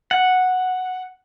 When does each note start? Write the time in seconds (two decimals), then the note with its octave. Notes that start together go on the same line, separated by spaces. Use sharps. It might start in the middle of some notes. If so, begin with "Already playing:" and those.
0.11 F#5